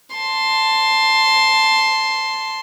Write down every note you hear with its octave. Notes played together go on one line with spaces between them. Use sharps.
A5 C6